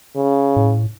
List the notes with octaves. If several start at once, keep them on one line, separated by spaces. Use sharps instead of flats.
C#3
A2